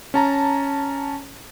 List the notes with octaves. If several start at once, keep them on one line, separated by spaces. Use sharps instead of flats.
C#4 A5 A#5